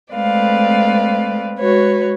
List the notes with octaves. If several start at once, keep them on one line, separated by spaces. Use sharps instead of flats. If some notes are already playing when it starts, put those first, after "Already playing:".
G#3 A3 C4 B4 D5 F5
G#3 F#4 B4 C#5